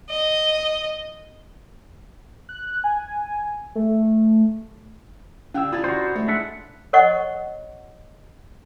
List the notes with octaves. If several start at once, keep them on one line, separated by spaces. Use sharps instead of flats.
D#5
F#6
G#5
A3
D3 C#4 G4 F5 G5 G#5 E6
D4 F4 A#4 B4 D#6 G#6 A6
E4 F#4 C5
G#3 A3
D4 E5 F#5
A#4 C#5 D#5 F#5 C#6